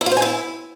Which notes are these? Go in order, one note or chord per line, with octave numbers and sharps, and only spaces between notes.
E4
F4
C5
G#5
E4